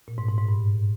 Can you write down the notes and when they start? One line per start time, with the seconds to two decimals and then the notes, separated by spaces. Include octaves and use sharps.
0.08 A#2
0.18 G#2
0.28 G#2
0.38 G#2
0.49 G2